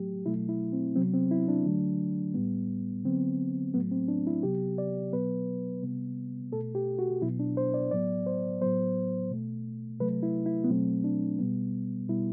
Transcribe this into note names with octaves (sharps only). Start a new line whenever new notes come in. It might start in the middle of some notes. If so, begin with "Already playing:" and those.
Already playing: A2 F#3 A3 G4
B2 F#3 A3 E4
E4
C4
C3 F#3 B3 C4
C4
E4
D4
D3 F#3 A3
A2 G3 B3
D3 F#3 B3 C4
A2 F#3 A3 B3
C4
D4
E4
C3 F#3 B3 G4
D5
B2 F#3 B3 B4
C3 G3 B3
B2 A3 A4
G4
F#4
B2 F#3 B3 E4
D4
C5
D5
A2 F#3 B3 D5
C5
A2 F#3 B3 C5
B2 A3
C3 F#3 A3 B4
E4
E4
B3
B2 F#3 A3 C4
D4
B2 G3 B3
B2 G3 B3 E4